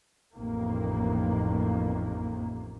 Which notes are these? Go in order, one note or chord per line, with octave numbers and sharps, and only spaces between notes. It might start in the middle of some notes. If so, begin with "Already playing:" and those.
A1 F2 C3 D#3 A#3